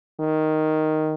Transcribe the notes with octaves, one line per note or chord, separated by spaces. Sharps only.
D#3